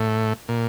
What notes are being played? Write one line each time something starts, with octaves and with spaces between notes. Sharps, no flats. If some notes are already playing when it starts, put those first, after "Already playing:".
Already playing: A2
A#2